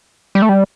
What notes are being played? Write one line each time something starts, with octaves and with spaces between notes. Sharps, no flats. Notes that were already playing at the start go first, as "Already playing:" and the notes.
G3
A3
G3